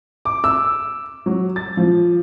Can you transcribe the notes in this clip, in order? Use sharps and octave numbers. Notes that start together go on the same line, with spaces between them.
D6
E6
F#3
A6
F3